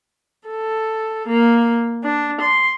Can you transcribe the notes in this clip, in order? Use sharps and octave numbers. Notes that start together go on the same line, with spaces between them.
A4
A#3
D4
C6